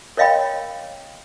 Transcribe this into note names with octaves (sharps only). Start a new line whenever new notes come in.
A#4 C#5 D#5 F5 G5 B5